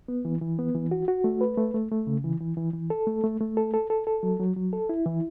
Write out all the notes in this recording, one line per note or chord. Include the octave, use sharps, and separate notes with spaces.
B3
E3
E3
B3
E3
F#4
F#4
A3
B4
A3
A3
A3
C#3
E3
E3
E3
E3
A4
A3
A3
A3
A4
A4
A4
A4
F#3
F#3
F#3
A4
E4
E3